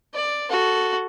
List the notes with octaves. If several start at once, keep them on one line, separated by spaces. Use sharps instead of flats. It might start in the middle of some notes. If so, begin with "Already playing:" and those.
D5
F#4 A4